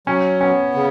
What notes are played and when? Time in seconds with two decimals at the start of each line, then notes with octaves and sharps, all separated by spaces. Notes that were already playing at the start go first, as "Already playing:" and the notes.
0.07 F#3 C#4
0.41 B3 C#4
0.75 C#3